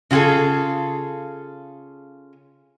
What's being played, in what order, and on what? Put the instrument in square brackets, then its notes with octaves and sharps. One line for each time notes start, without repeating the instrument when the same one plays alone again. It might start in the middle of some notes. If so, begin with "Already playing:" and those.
[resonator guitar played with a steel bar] C#3 F4 F#4 G#4 A4